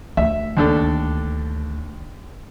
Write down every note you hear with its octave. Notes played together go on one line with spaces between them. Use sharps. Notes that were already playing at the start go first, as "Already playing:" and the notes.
D2 E5
D#2 D4 A4